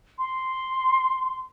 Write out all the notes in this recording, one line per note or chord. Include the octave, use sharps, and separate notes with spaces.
C6